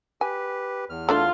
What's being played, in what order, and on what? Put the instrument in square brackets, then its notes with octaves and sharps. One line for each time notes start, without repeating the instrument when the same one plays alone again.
[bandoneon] G4 B4 [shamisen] G#5
[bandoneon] E2 F6
[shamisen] A3 D4 D5 [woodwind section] F4